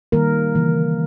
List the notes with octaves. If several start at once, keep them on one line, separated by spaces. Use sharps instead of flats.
D#3 G3 A#3 A#4
C#3 E3 A#3